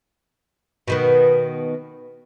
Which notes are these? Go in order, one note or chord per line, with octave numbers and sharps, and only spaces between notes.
B2 D#3 B3